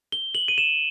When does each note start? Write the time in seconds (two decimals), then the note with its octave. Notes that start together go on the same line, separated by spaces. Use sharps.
0.12 G7
0.35 F#7
0.48 D#7
0.58 E7